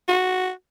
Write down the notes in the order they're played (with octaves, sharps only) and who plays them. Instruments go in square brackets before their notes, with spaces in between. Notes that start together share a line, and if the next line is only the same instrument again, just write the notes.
[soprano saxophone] F#4